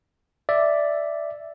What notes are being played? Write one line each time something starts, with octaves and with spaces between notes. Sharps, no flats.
D5 E5